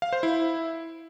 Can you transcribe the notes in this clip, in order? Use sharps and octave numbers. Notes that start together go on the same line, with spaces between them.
F5
C5
E4